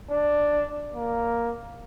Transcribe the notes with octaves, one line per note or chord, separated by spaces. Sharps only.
D4
A#3